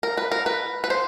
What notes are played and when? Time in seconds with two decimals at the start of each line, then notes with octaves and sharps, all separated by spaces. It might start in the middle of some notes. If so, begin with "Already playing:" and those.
0.03 A#4
0.17 B4
0.32 A#4
0.46 B4
0.84 B4
0.90 C5